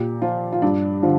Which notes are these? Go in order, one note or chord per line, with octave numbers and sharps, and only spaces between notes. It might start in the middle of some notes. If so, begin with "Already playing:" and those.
Already playing: A#2 G4
F3 F4
F4
G2 D4
D3 F3 F4